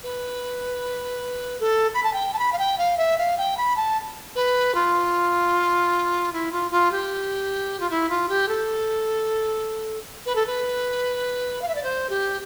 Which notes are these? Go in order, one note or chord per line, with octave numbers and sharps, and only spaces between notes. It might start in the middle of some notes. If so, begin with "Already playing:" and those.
B4
A4
B5
A5
G5
A5
B5
F5
G5
F5
E5
F5
G5
B5
A5
B4
F4
E4
F4
F4
G4
F4
E4
F4
G4
A4
B4
A4
B4
F5
E5
D5
C5
G4